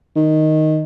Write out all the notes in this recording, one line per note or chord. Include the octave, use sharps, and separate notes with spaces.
D#3